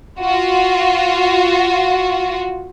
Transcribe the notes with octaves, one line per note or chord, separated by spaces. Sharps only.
F4 F#4